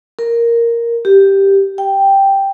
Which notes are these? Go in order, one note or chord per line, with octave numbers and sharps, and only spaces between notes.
A#4
G4
G5